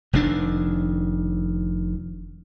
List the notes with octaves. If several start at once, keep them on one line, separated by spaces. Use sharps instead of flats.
F1 F2 D#3 D4